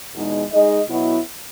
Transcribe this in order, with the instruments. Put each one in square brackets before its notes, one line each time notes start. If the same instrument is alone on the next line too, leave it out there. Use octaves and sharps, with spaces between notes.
[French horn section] E2 B2 G#3 D#4
G#3 D#4 G#4 D#5
B2 F#3 B3 E4